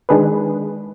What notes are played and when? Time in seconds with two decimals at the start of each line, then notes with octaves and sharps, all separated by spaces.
0.09 D#3 G#3 D4 G#4 B4